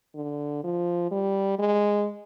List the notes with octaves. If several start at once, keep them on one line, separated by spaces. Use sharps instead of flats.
D3
F3
G3
G#3